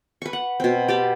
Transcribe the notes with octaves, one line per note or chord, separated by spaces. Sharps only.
B4 C#6
F#5
B2 C4
G4 A5 B5